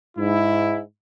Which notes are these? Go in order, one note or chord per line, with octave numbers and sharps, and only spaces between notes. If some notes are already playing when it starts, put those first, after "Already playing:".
G#2 E4